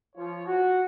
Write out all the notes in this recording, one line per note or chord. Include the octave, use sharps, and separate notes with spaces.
F3 F4 C#5
F#4